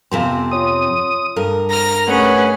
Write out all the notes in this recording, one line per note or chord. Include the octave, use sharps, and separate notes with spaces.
F2 C3 B3 C4 G#5 C6
F4 C#5 C6 D#6
G2 A4 A#4
A#5 F6 A#6
A3 C#4 G#4 B4 C#5 F#5 C#7